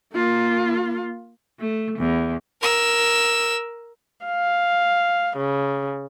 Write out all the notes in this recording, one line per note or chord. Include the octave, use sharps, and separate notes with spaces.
A#3 F4
A3
E2
A#4 E6
F5
C#3